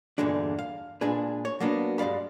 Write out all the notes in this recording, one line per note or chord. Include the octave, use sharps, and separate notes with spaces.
E2 G2 A#2 D3 G#3 D4
F5
A#2 G#3 D4 G#4 B4
C#5
F#3 A#3 B3 D4
G2 G#3 D5 F5 B5